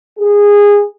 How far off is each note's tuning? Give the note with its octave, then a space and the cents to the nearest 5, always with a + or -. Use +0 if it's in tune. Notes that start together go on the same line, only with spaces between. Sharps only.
G#4 -20